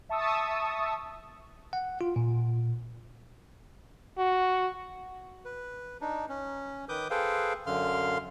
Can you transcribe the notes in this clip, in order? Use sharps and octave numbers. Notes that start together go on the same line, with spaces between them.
E5 A5 C#6 D#6 E6
F#5
F4
A#2
F#4
B4
D4 D#4
C#4
D#3 B4 D6 D#6 G6
G#4 A4 B4 C5 F5 G5
F#2 D3 F5 C6 F6